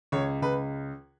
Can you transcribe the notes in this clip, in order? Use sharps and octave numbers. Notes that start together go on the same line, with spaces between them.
C#2 C#5
C#2 B4